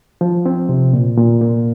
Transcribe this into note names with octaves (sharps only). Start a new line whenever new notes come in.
F3
C4
C3
A#2
A#2
A#3